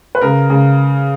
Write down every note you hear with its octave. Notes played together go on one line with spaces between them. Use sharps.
B4
C#3 A#4
C#3